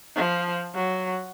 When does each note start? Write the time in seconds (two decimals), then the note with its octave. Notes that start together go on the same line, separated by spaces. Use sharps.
0.16 F3
0.75 F#3